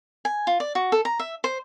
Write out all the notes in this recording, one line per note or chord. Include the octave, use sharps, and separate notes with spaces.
G#5
F4
D5
F#4
A4
A#5
E5
C5